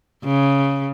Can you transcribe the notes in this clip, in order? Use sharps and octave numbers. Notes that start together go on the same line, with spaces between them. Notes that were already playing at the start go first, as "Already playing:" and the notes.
C#3